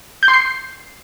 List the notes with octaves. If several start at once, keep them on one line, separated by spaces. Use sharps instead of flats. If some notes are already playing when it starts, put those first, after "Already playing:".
G6
C6
C7